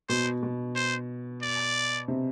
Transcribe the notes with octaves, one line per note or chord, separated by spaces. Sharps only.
B2 C5
B2
C5
D5
C3